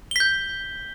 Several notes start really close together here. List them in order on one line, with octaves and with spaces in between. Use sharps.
G7 B6 G6